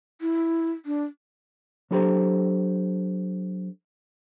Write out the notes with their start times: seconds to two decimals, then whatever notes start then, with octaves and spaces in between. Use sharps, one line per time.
0.21 E4
0.86 D4
1.91 F#3 D4 G4 A4 C5 A#5